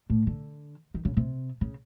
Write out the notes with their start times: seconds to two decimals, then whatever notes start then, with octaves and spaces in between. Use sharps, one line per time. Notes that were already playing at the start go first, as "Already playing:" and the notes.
0.10 A2
0.27 D3
0.94 D#3
1.05 C#3
1.17 C3
1.61 C#3